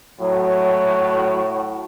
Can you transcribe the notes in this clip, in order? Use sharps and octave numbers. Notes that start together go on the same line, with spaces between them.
A2 F#3 F#4